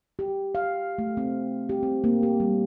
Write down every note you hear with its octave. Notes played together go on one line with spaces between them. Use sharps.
G4
F5
A3
C4
G4
C4
A#3
G4
G3